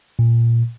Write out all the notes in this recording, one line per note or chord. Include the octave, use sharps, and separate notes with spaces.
A#2